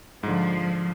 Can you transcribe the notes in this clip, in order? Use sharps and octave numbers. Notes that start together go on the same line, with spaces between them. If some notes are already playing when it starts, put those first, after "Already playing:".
G#2 D3 F3